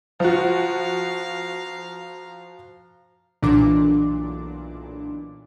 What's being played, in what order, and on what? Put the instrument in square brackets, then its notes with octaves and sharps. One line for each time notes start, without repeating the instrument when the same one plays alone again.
[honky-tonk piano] F3 F#4 [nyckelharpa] F5 A#5
[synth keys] B1 A#2 E3 D4 D6